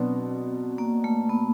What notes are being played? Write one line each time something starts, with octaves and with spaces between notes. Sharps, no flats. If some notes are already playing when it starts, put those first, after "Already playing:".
Already playing: B2 F#3 B3 C4 D4
A#3
A3
B3